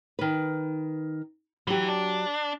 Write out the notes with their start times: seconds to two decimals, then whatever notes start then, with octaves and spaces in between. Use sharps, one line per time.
0.19 D#3 B4
1.67 E3 F#3 G4
1.89 D4